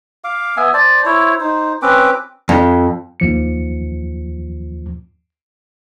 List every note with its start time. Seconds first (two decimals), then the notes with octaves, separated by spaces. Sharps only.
0.24 F5 D6
0.57 B3 E5 G#5
0.74 C5 D5 A5
1.05 E4 C5 C#5
1.40 D#4 C5
1.82 C4 C#4 B4 D6
2.49 F2
3.20 D#2 F3 C#7